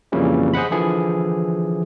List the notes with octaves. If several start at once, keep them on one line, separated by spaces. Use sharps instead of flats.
F2 A#2 C#3 E3 G3 C#4
G#4 C5 D#5 F#5 B5
D3 E3 F3 E4 G#4